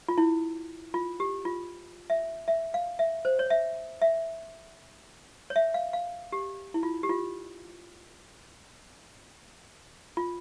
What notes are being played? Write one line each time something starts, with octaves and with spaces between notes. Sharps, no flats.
F4
E4
F4
G4
F4
E5
E5
F5
E5
C5
C#5
E5
E5
C#5
E5
F5
F5
G4
E4
F4
G4
F4
F4